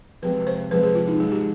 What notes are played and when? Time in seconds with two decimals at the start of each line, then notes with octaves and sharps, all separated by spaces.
0.22 C3 F3 G#3 C4 B4
0.47 C5
0.71 C3 F3 G#3 C4 B4
0.83 G#4
0.95 F4
1.07 D#4
1.19 G#2 F3 G#3 G#4
1.32 G4